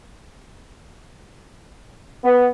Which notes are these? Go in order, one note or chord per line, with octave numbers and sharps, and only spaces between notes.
B3